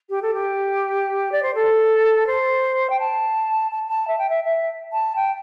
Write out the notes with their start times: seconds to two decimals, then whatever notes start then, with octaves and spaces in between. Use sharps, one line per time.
0.09 G4
0.22 A4
0.34 G4
1.32 D5
1.42 C5
1.54 A4
2.27 C5
2.89 G5
2.99 A5
3.71 A5
3.88 A5
4.07 E5
4.18 G5
4.29 E5
4.44 E5
4.92 A5
5.15 G5